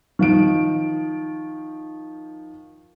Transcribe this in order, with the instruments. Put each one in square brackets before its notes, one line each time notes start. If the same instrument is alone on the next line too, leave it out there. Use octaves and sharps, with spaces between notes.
[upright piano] D#3 F3 D7